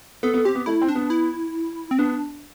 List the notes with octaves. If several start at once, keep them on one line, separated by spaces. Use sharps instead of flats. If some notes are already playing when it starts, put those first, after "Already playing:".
B3 A4
B3
C4 G4
B3
A3 E4
C4
D4
B3
E4
C4
B3 D4